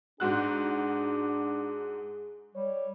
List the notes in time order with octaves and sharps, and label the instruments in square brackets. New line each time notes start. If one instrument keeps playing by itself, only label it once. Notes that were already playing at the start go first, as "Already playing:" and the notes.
[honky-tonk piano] G#2 F#4 F#6 [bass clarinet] D4 [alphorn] G#4
[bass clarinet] G3 [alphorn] C#5